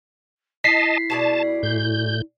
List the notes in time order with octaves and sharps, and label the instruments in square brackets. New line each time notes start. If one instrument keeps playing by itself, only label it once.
[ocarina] E4 [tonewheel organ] D#5 A5 [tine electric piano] B6 C7
[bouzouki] B2 G#4 D5 [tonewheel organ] A5
[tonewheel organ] A2 G6